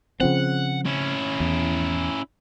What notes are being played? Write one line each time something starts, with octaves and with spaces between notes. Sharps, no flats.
C#3 F3 C4 F#5
C#4 E4
E2